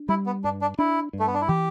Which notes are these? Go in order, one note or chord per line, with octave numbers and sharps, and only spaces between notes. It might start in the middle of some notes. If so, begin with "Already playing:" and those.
Already playing: D4
G3 E4
B3
G2 D4
D4
D4 E4
G2
A3
B3
D4
E4
E3 G4